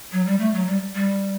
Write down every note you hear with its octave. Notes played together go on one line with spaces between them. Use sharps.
F#3
G3
A3
F#3
G3
G3